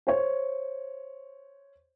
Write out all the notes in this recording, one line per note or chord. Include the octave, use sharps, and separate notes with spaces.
C5 C#5